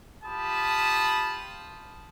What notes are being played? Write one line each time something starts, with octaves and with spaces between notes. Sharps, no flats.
F4 G4 A5 B5 D#6